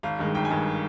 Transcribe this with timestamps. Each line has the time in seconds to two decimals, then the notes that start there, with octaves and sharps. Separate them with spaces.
0.03 G#1 F5
0.19 G2 D#3 G#3
0.35 G#1 G5
0.45 G#5
0.50 G2 D#3 G#3